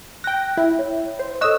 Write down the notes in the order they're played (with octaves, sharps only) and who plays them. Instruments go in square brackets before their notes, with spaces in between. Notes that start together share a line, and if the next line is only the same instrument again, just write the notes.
[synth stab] G5 A#6 [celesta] F#6
[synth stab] E4
[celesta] C#5
[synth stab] C5
[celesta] A4 D#6 F#6 [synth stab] C#5 D#5 E6